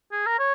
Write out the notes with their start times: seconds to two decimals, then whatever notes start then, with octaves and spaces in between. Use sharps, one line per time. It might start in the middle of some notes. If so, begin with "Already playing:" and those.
0.12 G#4
0.26 A#4
0.39 C#5